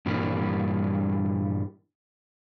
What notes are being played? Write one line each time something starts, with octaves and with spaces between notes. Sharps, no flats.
G2 A#2 E3 G3 A#3